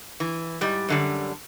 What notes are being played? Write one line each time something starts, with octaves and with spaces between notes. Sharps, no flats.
E3
G#2 G3
F#2 D3 G3